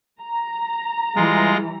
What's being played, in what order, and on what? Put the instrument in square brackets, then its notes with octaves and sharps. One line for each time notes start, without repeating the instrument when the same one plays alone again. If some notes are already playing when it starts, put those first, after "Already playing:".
[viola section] A#5
[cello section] E3 G3 [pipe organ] G#3 F4 A#6